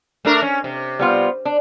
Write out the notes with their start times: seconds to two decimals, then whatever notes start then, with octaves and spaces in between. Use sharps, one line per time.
0.25 A3 D4 A#4
0.42 C#4
0.64 C3
0.99 G3 B3 F4
1.45 D4